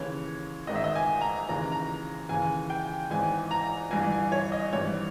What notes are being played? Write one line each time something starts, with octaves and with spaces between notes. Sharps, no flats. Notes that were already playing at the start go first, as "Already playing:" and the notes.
Already playing: D#2 C#3 E3 C#5
G#1 G#2 D#3 D#5
E5
D#5
G#5
A#5
D#2 C#3 E3 A#5
A#5
D#2 C#3 E3 G#5
G5
G#1 G#2 E3 G#5
A#5
G1 G2 E3 G#5
G#5
C#5
D#5
G#1 G2 E3 C#5